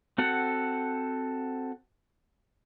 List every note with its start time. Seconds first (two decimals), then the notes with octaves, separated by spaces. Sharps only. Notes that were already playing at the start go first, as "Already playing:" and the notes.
0.18 C4 F#4 A4 F#5